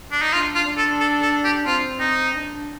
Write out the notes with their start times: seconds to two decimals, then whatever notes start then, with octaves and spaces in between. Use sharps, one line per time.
0.12 D4
0.22 D#4
0.33 D4 F4
0.55 F4
0.67 D4
0.77 A4
1.00 A4
1.22 A4
1.45 G4
1.66 C4 F4
2.00 C4 D#4
2.34 D4